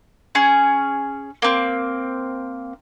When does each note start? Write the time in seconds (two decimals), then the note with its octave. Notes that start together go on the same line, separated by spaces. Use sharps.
0.35 C#4 G#4
1.42 A#3 C4